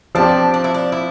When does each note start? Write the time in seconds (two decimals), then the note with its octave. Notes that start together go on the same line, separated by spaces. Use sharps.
0.15 F3 C4 D4 G4
0.54 D4
0.64 E4
0.74 D4
0.92 E4